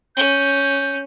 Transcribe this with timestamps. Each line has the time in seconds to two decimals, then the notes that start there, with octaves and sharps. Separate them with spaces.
0.16 C#4 G6